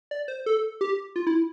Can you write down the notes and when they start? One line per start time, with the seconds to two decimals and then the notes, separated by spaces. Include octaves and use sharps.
0.11 D5
0.28 C5
0.46 A4
0.81 G4
1.16 F4
1.27 E4